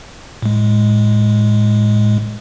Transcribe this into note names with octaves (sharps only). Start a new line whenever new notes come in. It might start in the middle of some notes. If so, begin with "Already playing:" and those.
A2 G#3